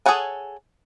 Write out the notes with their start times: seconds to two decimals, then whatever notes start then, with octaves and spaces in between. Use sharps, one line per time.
0.06 G#4 A4 C#5 F#5 G#5